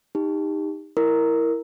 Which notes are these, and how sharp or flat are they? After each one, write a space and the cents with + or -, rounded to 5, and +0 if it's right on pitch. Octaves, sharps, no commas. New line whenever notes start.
D#4 +0 G4 +25
E4 +0 A#4 -5 A#5 +0